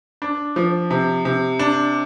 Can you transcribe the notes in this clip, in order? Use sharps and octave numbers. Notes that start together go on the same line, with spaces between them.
D4
F3
C3
C3
D4